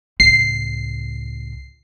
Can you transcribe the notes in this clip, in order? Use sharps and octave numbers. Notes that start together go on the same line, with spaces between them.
C#2 A2 C7